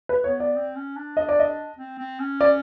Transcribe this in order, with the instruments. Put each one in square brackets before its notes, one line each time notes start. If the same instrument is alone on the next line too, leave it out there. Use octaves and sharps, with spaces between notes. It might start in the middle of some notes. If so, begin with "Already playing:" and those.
[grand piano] B4
[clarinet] B3 [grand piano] C#5
[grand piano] D5
[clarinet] C4
C#4
D4
[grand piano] D#5
D5
D#5
[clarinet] C4
C4
C#4
[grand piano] D5